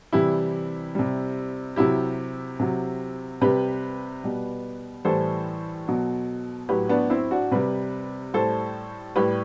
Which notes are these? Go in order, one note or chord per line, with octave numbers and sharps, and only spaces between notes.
C3 E3 G3 E4 G4
C3 G3
C3 F#3 E4 G4
C3 F#3
C3 G3 G4 B4
B2 G3
A2 E3 G3 A4 C5
B2 F#3
A2 F#3 G4 B4
B3 D4
C4 E4
D4 F#4
C3 G3 G4 B4
A2 G3 A4 C5
A2 G3 G4 B4